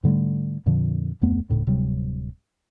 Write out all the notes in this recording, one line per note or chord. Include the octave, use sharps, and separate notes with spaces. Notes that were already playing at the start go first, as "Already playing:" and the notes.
G#2 D3 G3 A3
F2 A#2 D3 F3
D1 F2 A3 B3
D#1 D2 A2 C#3
D1 C3 F#3 G3